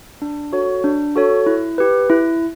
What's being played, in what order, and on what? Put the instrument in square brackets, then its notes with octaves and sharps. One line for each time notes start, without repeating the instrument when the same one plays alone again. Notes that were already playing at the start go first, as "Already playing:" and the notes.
[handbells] D4
F#4 A4 C#5
D4
F#4 A4 C#5
E4
G4 B4
E4